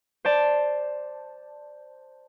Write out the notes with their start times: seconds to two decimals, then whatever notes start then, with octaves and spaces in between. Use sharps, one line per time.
0.25 C5 D5 A5